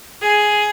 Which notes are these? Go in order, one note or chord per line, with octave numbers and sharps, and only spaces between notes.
G#4